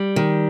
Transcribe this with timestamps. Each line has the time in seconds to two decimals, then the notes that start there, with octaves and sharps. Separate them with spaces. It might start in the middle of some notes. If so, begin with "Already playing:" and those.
Already playing: G3
0.16 D#3